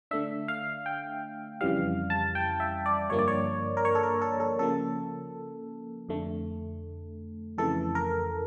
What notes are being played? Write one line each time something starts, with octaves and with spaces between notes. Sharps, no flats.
D3 A3 D4 E5
F5
G5
F2 C#3 E3 G3 F5
A5
G5
E5
D5
G2 D3 F3 A#3 D4 C#5
D5
C#5
A#4
C#5
A4
A#4
A4
A4
C#3 F3 A#3 A4
F2 D3 A3
F2 C#3 E3 A3 A4
A#4